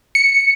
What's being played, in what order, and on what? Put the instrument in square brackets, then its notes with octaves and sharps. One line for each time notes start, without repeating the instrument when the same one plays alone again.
[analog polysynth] C#7